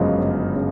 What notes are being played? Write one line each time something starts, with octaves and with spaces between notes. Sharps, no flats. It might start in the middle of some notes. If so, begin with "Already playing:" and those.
Already playing: G1 F#2 C#3 F3 G#3 D#5 F5
G1
C#3